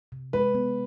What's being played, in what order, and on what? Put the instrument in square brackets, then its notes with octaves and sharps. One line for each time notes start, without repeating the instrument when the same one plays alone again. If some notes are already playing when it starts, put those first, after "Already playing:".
[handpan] C3
[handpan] G#3 [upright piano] B4
[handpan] B3